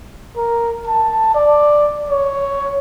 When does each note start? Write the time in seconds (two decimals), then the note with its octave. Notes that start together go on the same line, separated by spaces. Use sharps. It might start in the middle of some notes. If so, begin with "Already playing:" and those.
0.37 A#4
0.87 A5
1.35 D5
2.10 C#5